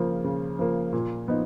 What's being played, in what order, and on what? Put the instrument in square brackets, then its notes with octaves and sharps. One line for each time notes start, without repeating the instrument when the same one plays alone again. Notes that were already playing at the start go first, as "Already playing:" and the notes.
Already playing: [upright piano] C#3 F3 A#3
C#3
F3 A#3
A#2
F3 B3 D#4